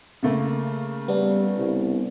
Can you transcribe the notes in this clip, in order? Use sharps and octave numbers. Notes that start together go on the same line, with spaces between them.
C#3 A3 A#3
G3 B3 D4
C2